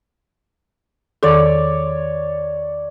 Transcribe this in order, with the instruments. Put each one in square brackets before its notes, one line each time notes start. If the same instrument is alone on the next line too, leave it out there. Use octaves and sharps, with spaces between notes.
[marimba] E2 D#3 A4 [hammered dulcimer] C#5 D5